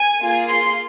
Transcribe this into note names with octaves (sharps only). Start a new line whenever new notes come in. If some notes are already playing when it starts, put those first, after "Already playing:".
Already playing: G#5
A#3 F4 G#4
C6